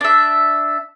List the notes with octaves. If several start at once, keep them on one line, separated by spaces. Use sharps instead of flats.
D4 E5